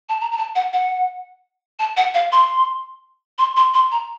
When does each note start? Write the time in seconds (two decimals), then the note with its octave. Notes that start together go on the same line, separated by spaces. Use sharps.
0.09 A5
0.21 A#5
0.32 A#5
0.38 A5
0.55 F#5
0.73 F#5
1.79 A5
1.97 F#5
2.14 F5
2.32 C6
3.38 C6
3.56 C6
3.74 C6
3.91 A#5